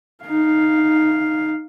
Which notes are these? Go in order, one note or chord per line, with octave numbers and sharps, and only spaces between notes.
D#4 F5